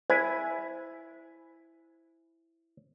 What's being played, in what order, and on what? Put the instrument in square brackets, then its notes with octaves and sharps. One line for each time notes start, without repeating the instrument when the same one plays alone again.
[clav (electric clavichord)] E4 G#5 [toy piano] C5